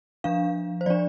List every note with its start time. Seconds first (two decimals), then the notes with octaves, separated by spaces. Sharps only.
0.24 F3 D4 F5
0.81 C5
0.86 F3 D4 D5